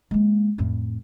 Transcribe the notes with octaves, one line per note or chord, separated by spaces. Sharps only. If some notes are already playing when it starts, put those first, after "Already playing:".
G#3 A#3
F2 A2